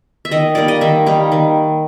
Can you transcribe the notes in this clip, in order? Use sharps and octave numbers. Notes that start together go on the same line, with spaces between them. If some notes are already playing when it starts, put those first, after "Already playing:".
E5
D#3 D#5
G3 A#3 D#4 D5
D#5
D#3 E5
G3 A#3 D#4
D#3